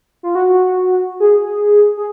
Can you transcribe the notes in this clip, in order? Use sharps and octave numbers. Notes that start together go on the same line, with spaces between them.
F4
F#4
G#4
G#4